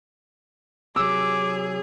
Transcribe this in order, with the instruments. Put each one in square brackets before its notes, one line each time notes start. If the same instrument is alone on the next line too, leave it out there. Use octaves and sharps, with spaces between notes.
[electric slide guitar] C3 F#3 [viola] G#4 [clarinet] D6 [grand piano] E6